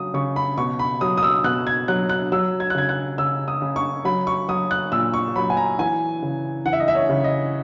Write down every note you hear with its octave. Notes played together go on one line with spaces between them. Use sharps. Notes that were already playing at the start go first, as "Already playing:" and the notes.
Already playing: C#3 F#3 D#6
C#3 C#6
B5
B2 C#6
B5
F#3 D#6
D#6
E6
B2 F#6
G#6
F#3 F#6
F#6
F#3 E6
G#6
F#6
C#3 G#6
F#6
C#3 E6
D#6
C#3
C#6
F#3 B5
C#6
F#3 D#6
F#6
A#2 E6
C#6
F#3 B5
G#5
A#5
E3 G#5
C#3
E3 F#5
E5
D#5
E5
C#5
C#3
D#5